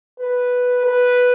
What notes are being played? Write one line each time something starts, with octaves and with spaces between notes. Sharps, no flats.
B4
B4